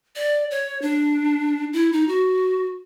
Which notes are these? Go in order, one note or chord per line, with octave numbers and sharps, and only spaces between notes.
D5
C#5
D4
E4
D#4
F#4